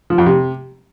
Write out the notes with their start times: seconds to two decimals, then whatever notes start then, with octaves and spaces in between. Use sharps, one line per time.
0.10 F3
0.18 F2
0.26 C3